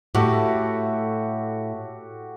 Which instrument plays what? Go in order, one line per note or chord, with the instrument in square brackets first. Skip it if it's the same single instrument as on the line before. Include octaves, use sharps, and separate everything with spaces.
[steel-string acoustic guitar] A2 [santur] A3 F#4 G4